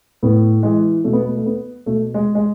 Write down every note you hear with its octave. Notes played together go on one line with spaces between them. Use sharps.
A2 B3
E3 G#3
B2 A3
B3
A3
A3
B3
B2 A3
G#3
G#3